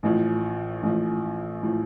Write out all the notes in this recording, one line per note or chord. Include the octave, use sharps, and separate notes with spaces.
A1 A2 F3
A1 A2 F3
A2 F3